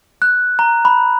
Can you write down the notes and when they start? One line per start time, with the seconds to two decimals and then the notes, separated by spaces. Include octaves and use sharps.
0.22 F#6
0.59 A#5
0.85 B5